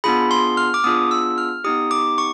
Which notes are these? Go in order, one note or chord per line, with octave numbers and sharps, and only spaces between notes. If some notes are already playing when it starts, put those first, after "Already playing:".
B3 D4 F4 G#4 B5
C6
F6
D6
B3 D4 F4 G#4 D#6
E6
F6
B3 D#4 G4 D#6
D6
C#6